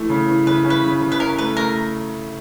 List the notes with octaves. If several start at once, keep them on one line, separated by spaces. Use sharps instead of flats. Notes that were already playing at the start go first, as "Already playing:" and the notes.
Already playing: E3 A3
C#3
E3
C#3 B4
C#4
B4
C#3
C#3
B4
C#4 A#4
A3 B4
A3 A#4